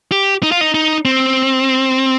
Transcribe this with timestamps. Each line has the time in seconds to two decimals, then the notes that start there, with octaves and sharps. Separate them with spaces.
0.12 G4
0.43 D#4
0.52 F4
0.61 D#4
0.74 D#4
1.05 C4